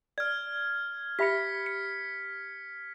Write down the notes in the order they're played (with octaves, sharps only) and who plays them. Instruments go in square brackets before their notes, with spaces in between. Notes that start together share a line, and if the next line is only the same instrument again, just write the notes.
[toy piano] D5 [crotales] F6 G#6
[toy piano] G4 E5 B5 [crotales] B6 C#7
[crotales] C#7